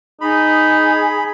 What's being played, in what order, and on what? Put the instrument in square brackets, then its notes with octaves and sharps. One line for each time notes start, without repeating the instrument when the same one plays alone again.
[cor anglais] D#4 [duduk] G#4 [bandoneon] B5